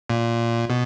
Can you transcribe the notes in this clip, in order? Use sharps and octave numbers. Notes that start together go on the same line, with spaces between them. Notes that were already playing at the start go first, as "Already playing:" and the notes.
A#2
B2